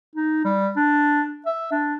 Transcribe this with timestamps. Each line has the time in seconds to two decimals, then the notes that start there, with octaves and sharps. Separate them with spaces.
0.16 D#4
0.45 G3
0.76 D4
1.46 E5
1.71 D4